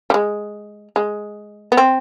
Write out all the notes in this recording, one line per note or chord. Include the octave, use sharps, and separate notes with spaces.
G3
G#3
G#3
B3
C4